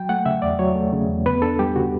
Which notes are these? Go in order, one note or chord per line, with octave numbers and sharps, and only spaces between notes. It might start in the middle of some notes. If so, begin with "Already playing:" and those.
Already playing: F#3 G5
A3 F#5
C#3 E5
E2 D5
F#3 C#5
A3
C#3
E2
B3 B4
D4 A4
G3 G4
C#3 F#4